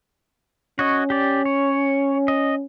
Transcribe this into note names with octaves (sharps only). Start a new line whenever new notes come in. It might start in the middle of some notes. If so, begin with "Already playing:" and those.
C#4 F#4 C#5 D#5
G4 D5
C#5
D#5